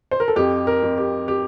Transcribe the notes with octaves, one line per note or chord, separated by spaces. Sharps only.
C5
A#4
A4
F2 G4
A#4
F2
G4
G4